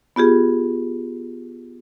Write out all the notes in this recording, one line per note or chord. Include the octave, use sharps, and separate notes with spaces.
B3 F4 G4 G#4